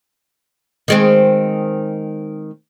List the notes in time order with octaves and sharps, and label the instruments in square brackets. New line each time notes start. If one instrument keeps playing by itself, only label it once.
[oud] D#3 G#3 C4